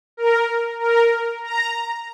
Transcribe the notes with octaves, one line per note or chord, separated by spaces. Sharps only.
A#4
A#4
A#5